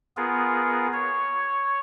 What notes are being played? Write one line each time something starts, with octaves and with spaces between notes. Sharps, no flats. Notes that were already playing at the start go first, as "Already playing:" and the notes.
B3 F4 G#4 A#4
C#5